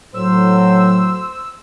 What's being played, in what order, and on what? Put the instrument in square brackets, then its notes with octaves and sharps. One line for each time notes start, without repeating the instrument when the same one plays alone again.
[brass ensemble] A2 F#3 [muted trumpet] C5 [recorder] E6